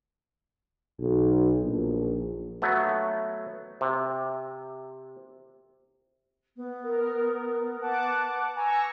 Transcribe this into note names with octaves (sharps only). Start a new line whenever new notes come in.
B1
A#1
F#3 A3 B3
C3
B3
A#4
B4 F#5 A5 D6
G#5 A#5 C#6 E6